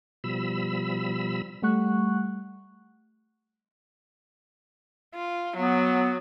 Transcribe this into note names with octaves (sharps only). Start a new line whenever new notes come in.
B2 F3 G3 B5 E6
G3 A3 F#5 C#6 F#6
F4
F#3 B3